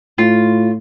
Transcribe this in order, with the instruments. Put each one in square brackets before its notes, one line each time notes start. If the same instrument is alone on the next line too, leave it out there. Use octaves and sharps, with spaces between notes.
[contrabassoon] A2 [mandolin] F4